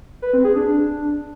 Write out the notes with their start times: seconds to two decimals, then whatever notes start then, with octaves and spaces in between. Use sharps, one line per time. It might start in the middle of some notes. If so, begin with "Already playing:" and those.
0.22 B4
0.33 C4
0.45 G#4
0.56 D4